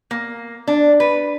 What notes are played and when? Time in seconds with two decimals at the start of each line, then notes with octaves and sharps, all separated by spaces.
0.11 A#3
0.68 D4
1.00 B4